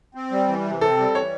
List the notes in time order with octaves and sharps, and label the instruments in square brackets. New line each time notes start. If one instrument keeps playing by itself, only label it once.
[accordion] C4
G3
E3
C3
[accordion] C4 [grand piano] A4
[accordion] G3
[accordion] E3 [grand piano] C#5